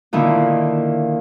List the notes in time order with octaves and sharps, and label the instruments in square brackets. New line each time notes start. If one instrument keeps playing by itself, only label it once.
[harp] A#2 D3 D#3 A#3 E4